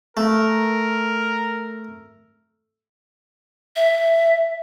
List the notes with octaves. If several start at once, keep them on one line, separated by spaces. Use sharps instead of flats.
A3 A#4
E5